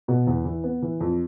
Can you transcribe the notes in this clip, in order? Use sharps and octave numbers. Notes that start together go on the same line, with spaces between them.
B2
E2
E3
B3
E3
F2